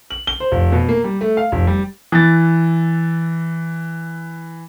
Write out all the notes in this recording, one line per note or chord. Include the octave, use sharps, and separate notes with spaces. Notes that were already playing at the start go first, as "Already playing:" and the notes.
F#7
G7
C5
F1
B2
A#3
G3
A3
F5
F1
G3
E3 A6